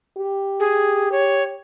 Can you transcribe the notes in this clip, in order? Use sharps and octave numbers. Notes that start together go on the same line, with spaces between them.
G4
G#4
C#5